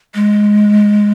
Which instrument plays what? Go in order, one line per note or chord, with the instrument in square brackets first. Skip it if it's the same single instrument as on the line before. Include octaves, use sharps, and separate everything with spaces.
[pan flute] G#3